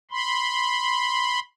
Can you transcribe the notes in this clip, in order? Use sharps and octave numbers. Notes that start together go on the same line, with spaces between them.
B5 C6